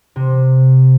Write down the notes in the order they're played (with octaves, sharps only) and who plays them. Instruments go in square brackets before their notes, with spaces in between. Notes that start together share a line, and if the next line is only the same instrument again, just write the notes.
[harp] C3